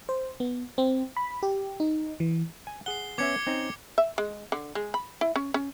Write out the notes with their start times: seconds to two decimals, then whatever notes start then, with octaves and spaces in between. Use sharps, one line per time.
0.09 C5
0.40 B3
0.78 C4
1.17 B5
1.43 G4
1.80 D#4
2.20 E3
2.67 G#5
2.86 G#4 F#5 C7 G7
3.18 B3 C#4 E5 D6 G#6 C#7
3.47 C4 C#4 D#4
3.98 E5
4.18 G#3
4.52 D3
4.75 G#3
4.94 B5
5.21 E4
5.36 C#4
5.54 C#4